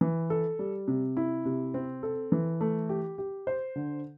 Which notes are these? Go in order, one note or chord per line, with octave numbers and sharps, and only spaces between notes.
E3
A4
G3
C3
E4
C3
C4
A4
E3
A3
G4
G4
C5
D3